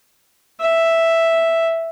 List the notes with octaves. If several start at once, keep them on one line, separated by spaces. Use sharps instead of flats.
E5